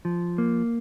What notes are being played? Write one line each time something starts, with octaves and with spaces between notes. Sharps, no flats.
F3
A#3